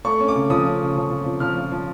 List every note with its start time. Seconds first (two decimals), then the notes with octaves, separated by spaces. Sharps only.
0.05 A3 C#6
0.20 C#4
0.28 D6
0.35 C#3
0.50 F3 D#6
0.65 C#4
0.81 C#3
0.96 F3
1.10 F3
1.25 F3
1.40 F3 F6
1.56 F3
1.71 F3